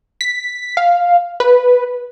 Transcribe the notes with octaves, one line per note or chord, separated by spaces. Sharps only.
B6
F5
B4